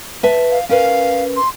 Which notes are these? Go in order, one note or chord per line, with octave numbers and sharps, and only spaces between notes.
B4 E5 A5
F5
C#4 A#4 B4 F5
C6